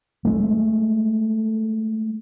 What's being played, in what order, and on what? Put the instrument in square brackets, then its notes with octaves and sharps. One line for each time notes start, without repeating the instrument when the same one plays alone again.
[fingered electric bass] G#3 A3